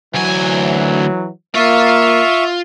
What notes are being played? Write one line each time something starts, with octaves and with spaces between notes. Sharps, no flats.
D2 E3 F#3 G#5
A#3 F4 E5 F5 C#6